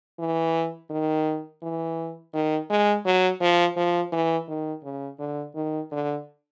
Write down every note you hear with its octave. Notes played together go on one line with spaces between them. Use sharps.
E3
D#3
E3
D#3
G#3
F#3
F3
F3
E3
D#3
C#3
D3
D#3
D3